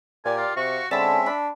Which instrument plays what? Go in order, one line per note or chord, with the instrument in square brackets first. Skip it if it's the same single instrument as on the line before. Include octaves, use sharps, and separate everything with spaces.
[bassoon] A#2 [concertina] G4 A#4 D5 [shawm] G#5
[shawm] F4
[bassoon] C3 [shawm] F#4 [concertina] F5 C#6
[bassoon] D3 [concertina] G#3 C4 C#4 [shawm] E5 [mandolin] A5 B5
[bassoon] D4 [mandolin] B5